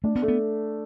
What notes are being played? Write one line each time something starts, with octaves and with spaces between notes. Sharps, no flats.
A3 D4
B3
A3
B3